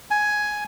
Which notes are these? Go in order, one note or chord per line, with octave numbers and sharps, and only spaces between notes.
G#5